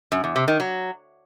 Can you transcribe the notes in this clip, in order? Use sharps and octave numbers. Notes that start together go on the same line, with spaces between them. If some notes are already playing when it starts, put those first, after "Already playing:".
F#2
E2
C3
D#3
F#3